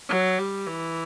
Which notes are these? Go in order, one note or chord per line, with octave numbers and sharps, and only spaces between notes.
F#3
G3
E3